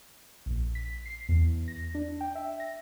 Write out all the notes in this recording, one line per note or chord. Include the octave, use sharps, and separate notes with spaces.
A#1
B6
C7
E2
A#6
D4
G5
E5
A#6